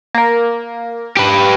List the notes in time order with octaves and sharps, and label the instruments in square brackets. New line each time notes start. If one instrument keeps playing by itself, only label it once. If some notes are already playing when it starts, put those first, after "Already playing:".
[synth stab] A#3 A#4
[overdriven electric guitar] G4 B4